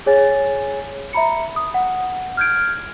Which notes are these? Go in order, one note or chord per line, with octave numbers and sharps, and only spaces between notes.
G#4 C#5 G#5 A6
E5 A#5 B5 C#7
D#6
F#5
F6 G6 G#6 D7